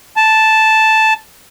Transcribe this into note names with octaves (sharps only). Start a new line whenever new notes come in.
A5